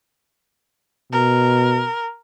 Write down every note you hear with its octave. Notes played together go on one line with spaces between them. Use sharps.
B2 A#4